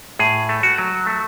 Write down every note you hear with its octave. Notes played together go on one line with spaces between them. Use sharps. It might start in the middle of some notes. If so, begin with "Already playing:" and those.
A2 G#4
A3
F#4
F#3
A3